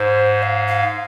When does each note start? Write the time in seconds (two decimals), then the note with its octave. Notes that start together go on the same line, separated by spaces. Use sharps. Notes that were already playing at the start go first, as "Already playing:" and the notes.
Already playing: G#2 C5
0.43 F5
0.67 F5